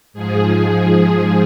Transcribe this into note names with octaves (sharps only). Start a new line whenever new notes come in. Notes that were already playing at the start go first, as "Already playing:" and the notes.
G#2 F3 G#4